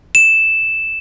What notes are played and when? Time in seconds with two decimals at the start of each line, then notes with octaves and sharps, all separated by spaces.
0.15 E7